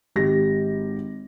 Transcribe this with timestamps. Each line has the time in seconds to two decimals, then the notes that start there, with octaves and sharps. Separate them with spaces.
0.16 G#1 G4 A#6